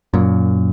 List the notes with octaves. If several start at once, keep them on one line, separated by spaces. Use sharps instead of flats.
F#2 A#2